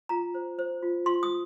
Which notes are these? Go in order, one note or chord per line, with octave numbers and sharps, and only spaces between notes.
F4 A#5
C5
C5
F4
F4 C6
D#6